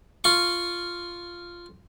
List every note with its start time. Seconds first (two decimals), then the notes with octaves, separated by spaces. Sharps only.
0.24 F4 C#6